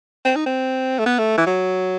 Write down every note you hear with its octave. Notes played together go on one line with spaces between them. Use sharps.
C4
D#4
C4
A3
B3
A3
E3
F#3